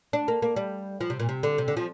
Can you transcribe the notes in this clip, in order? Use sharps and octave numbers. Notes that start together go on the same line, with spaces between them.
D4
A#3
A#3
G3
F3
C3
A#2
C3
D3
C3
D3
F3